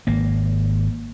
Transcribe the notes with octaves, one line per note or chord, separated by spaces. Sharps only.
G#1 A#3